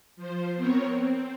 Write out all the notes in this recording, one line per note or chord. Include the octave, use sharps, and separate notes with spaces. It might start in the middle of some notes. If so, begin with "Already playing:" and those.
F3 C5
B3 C4 A#4 C#5
C4